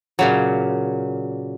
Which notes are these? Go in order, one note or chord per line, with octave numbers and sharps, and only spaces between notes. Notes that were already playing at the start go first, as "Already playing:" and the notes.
A#2 C#3 F#3